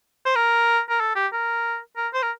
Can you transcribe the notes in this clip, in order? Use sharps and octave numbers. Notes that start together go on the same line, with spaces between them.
C5
A#4
A#4
A4
G4
A#4
A#4
C5
A#4